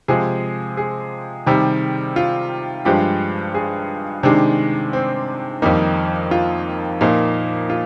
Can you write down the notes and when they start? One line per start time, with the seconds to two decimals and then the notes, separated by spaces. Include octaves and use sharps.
0.08 C3 F3 G#3 G#4
0.77 G#4
1.46 C3 D#3 G3
2.16 F4
2.85 G2 F3 G#3 G4
3.54 G#4
4.23 C3 D#3 G#3 D4
4.93 C4
5.62 F2 D#3 G3 A#3 D#4
6.31 F4
7.01 A#2 F3 A#3 D#4
7.70 F4